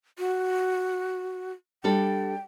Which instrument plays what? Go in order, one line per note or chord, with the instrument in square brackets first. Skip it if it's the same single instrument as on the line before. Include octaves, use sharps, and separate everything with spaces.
[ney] F#4
[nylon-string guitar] G3 D4 A4 [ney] G5